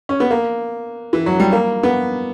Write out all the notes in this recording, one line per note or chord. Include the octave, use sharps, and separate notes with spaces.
C#4
B3
A#3
E3
F#3
G3
A#3
B3